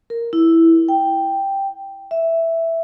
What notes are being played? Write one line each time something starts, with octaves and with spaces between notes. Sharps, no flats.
A#4
E4
G5
E5